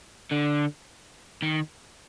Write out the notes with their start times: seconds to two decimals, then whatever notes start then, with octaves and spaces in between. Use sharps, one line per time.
0.32 D3
1.42 D#3